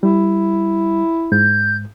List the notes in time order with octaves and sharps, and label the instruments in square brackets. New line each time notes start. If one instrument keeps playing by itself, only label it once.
[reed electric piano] G3 [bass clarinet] E4
[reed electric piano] G#2 [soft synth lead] G6